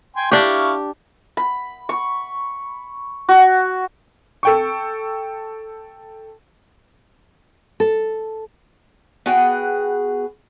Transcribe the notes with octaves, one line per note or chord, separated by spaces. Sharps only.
G5 G#5 C6
D4 E4 G4 F5 C#6
B5
C#6
F#4
A4 G5 C#6
A4
B3 F#4 G#4 G5